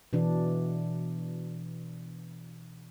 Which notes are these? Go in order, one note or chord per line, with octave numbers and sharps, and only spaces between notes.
B2 E3 D4